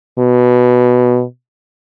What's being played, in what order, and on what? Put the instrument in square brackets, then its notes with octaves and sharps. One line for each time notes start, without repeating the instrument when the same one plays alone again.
[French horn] B2